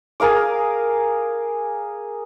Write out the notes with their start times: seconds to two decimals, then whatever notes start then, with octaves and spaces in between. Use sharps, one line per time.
0.20 G#4 A#4 F5 D6